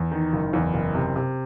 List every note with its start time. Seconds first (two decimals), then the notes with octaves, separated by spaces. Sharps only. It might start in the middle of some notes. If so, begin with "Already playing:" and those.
Already playing: E2
0.12 D#3
0.33 F#1
0.53 E2
0.74 F#1
0.94 C3
1.16 C3